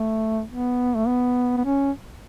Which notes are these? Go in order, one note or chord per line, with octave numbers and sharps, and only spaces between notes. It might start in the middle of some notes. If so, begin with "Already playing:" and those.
Already playing: A3
B3
A3
B3
B3
C#4